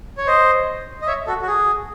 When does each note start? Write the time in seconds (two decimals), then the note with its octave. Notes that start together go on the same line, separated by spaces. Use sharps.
0.18 C#5
0.27 C5 D#5
1.02 D#5
1.07 C#5 E5
1.27 F#4 A4
1.42 F#4
1.47 G#4